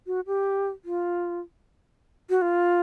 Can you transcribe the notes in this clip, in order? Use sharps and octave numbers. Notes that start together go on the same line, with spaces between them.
F#4
G4
F4
F#4
F4